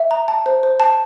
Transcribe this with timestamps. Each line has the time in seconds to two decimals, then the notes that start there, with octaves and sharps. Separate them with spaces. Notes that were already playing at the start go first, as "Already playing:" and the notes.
Already playing: E5
0.11 A#5
0.28 A5
0.46 C5
0.63 C5
0.80 A5